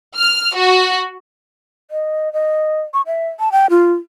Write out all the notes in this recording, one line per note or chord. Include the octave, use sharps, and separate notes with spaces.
F6
F#4
D#5
D#5
C#6
E5
A5
G5
F4